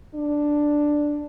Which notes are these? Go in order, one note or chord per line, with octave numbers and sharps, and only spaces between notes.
D4